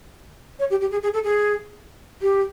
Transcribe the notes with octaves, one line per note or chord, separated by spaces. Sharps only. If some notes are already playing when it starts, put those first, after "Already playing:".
C#5
G4
G4
G#4
G#4
A4
G#4
G4